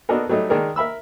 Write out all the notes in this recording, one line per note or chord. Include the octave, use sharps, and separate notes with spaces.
B3 D4 D#4 F#4 A4 A#4
F#3 G3 A3 D#4
D#3 G#3 D4 A#4
A#4 E5 B5 E6